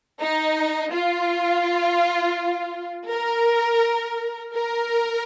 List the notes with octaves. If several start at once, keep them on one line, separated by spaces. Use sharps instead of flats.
D#4
F4
A#4
A#4